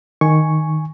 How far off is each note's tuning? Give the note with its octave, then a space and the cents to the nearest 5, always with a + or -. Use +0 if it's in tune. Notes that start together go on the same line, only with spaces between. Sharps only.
D#3 +0 G#5 +0 C#6 +0